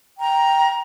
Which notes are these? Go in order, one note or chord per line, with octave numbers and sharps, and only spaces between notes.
G5 A#5